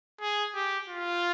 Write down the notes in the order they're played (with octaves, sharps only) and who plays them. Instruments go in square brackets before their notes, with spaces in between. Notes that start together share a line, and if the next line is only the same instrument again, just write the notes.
[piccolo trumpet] G#4
G4
F4